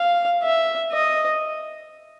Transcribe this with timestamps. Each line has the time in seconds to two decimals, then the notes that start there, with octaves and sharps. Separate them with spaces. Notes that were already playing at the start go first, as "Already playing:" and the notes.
Already playing: F5
0.43 E5
0.92 D#5